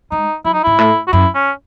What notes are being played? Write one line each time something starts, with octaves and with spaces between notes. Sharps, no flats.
G#3 D#4
F#3 E4
D#4
G#2 E4
A2
F#4
F#2 E4
C#4